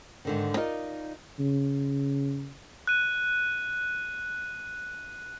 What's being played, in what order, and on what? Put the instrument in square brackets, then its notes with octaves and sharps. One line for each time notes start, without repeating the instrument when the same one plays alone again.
[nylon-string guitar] G#2 D3 D#3
D#4 F4 A#4 D5 D#5
[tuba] C#3
[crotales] F#6 D#7